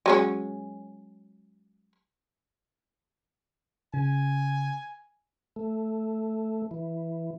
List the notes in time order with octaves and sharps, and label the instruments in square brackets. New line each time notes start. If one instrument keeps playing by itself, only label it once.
[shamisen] F#3 G#3 C#4
[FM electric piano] C#3 [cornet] G#5
[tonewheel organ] A3
E3